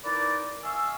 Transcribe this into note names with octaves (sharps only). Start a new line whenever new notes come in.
D#4 E4 A#4 B4 D5
D#5 F5 G#5 C#6 E6